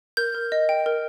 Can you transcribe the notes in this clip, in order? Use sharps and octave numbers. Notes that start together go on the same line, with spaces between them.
A#4 G6
A#4
D#5
G5
A#4